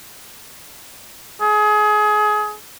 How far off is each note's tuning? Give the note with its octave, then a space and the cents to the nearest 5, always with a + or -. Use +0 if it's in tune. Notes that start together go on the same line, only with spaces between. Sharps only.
G#4 +25